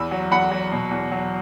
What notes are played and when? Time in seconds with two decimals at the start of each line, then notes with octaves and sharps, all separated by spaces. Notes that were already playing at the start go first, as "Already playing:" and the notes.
Already playing: E2 B5 E6
0.11 F#3
0.31 E2 F#5 B5
0.51 F#3
0.72 B2
0.91 E2
1.12 F#3